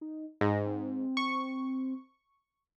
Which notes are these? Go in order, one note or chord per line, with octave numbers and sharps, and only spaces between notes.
D#4
G#2 A#6
C4
C#6